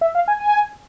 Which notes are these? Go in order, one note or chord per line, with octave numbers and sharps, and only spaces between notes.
E5
F5
G#5
G#5